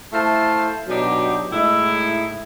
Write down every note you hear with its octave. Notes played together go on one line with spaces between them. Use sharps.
A3 E4 C5 F5 A5
B2 F#3 D4 D#4 G4
A2 G#3 D#4 E4